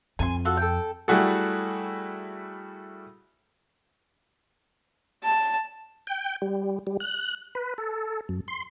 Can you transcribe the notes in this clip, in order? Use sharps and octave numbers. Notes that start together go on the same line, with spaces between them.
F2 G#5 A5 C6
F4 F#4 A4
A4 G5
G3 A3 E4 F#4 G#4 A4
A5
G5
G3
G3
F#6
B4
A4
F#2
C6